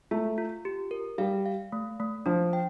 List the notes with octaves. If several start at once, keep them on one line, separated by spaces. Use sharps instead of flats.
A3 F4
F4
G4
A#4
G3 F5
F5
A3
A3
F3 D4
G5